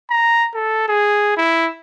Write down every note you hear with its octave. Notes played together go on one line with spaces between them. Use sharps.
A#5
A4
G#4
E4